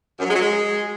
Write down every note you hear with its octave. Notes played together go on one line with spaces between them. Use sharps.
F#2
F#3
G#3
F#3
G#3